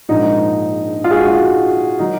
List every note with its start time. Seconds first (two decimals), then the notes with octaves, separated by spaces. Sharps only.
0.08 A#1 G#2 F3 A#3 D#4
1.04 F4
1.11 G#4
1.15 F#4
1.28 F4
1.39 F#4
1.99 D#3 F#3 D#4